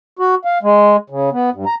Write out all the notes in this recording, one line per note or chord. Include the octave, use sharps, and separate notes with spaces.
F#4
F5
G#3
C#3
B3
G2
A#5